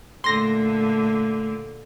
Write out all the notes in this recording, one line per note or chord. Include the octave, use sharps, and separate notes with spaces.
A#2 D3 A3 C6 A#6